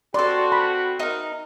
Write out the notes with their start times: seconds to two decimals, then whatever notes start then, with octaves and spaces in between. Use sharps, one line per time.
0.14 C4 F#4 A4 D5 C6
0.52 B5
1.00 D#4 A#4